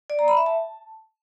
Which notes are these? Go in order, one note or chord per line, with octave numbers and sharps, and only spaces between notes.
D5
A#5
B5
E5
A5